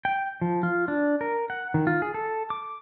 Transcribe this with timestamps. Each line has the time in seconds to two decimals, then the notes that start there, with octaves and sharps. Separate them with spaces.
0.05 G5
0.41 F3
0.63 F4
0.88 D4
1.21 A#4
1.50 F#5
1.74 D#3
1.87 F4
2.02 G#4
2.14 A4
2.50 D6